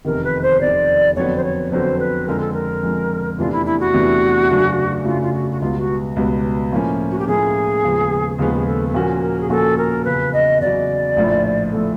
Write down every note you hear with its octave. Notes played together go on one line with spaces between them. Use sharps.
F1 E2 C3 D#3 A#4
B4
C5
F1 E2 C3 D#3 D5
F2 D3 F#3 B3 C#5
C5
C#5
F2 D3 F#3 B3 C5
B4
F2 D3 F3 G#3 A#4
A4
A#4
F2 D3 F3 G#3
E2 C3 E3 A3 D4 F4
E4
E4
F#4
E2 C3 E3 A3 D4
F#2 C#3 F#3 A3 D4
F#2 C#3 F#3 A3 D4 F4
F4
F#4
F#4
C#2 B2 G3 B3 F4
F#4
C#2 B2 G3 B3
A2 F3 A#3 C#4
F#4
G4
A2 F3 A#3 C#4 G#4
D#2 C#3 F3 G#3 B3
D#2 C#3 F3 G#3 B3 G#4
G#4
A4
A4
A#2 F3 A#3 C#4 F#4 A#4
A#4
G#4
A#2 F3 A#3 C#4 F#4 A4
A#4
E2 C#3 F#3 B4
D#5
E2 C#3 F#3 D5
A#1 A2 F3 A3
A2 F3 A3 A4